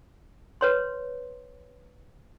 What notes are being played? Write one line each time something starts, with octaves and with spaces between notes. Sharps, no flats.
B4 C#5 C6